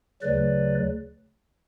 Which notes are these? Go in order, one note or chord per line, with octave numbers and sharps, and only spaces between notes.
D2 C#3 F#3 B4 D5